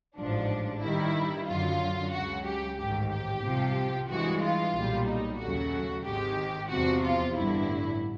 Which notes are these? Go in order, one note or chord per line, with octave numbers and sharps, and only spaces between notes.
A1 G#2 F3 D4
G2 D#3 G3 E4
F#2 D3 F#3 F4
C#2 C#3 F#3 F#4
G4
A1 G#2 D#3 G4
G4
C2 C3 F3
G2 E3 G#3 F#4
F4
B1 A#2 G3
D#4
D#2 C#3 F#3 A3 F#4
G#1 G#2 D#3 G#3 G4
E2 C3 F3 F#4
F4
A1 G2 D3 E4